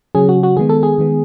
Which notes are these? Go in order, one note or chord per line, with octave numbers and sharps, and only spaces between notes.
C#3 F#3 C#4 G#4
F#4
F#4
D#3 G#3 B3 G#4
A4
G#4
D#3 G#3 B3